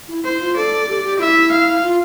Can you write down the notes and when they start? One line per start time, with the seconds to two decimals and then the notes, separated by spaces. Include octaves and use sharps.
0.08 E4
0.24 E4 C5
0.40 F4
0.56 A4 D5
0.88 G4
1.04 G4
1.19 E4 E5
1.52 F5
1.83 F4